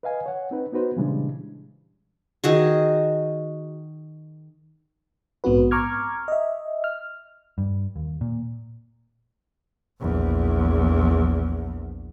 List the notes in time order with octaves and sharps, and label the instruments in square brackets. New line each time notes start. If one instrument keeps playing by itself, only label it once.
[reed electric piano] B4 D#5 F5 G#5
C#5 F#5
C4 D#4 B4
B3 D#4 F#4 B4 C5
A#2 C#3 E3 G3 G#3 D4
[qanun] D#3 F#4 G#4
[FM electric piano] A#1 G#2 B3 C4 F#4 B4
A#5 C#6 D6 F6 G#6
D#5 E5
F6
[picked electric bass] G2
D#2
A#2
[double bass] A#1 E2